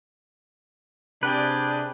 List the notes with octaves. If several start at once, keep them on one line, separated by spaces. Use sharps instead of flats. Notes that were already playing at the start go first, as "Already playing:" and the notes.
C3 D4 G#4 B4 D5 G5